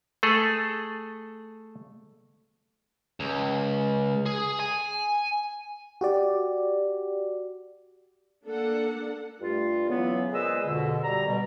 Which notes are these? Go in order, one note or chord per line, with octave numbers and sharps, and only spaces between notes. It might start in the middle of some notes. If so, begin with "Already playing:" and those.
A3 G#4 A4
C#2
G#4
G#5
F#4 G4 D5
A#3 D4 A4 F#5
G2 G3 A3 F4
C#3 E3 F#3 B3
A#2 G#3 B4 C5 D#5 E6
F2 B2 D3
G3 A#5
B2 G3